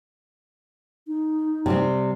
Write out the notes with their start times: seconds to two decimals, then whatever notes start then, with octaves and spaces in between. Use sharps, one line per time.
1.07 D#4
1.66 C3 G3 C4